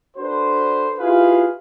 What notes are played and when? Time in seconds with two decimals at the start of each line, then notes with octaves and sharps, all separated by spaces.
0.16 D4 F#4 A4 B4 C5
0.99 E4 F4 G4 G#4 B4 F5